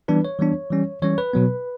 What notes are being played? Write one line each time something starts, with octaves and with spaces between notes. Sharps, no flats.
E3 G3 B3 D4 B4
C#5
E3 G3 B3 D4
E3 G3 C#4
E3 G3 C#4 C#5
B4
B2 F#3 B3